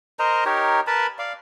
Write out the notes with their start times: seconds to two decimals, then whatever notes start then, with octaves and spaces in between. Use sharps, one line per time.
0.19 A#4 C5 D#5 A#5
0.46 D#4 G4 A#4 C#5
0.87 A#4 B4 A5 B5
1.19 D5 F5